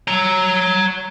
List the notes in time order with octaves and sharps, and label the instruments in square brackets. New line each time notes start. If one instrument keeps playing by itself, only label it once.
[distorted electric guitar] C#5 A#5